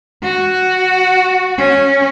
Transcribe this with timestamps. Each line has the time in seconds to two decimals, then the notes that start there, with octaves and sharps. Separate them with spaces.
0.23 F#4
1.58 C#4